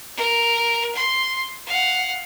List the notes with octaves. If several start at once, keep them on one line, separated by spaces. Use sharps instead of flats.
A#4
C6
F5 F#5